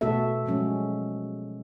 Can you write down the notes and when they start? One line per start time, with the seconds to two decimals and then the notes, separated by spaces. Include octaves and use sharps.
0.01 B2 A3 B3 F#4 A4 E5
0.46 F3 F#3 G#3 C#4